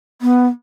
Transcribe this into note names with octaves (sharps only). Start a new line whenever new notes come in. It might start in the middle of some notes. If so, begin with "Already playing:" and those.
B3